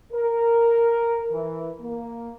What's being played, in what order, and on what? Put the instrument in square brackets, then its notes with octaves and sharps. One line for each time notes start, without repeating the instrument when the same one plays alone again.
[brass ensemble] A#4
E3
A#3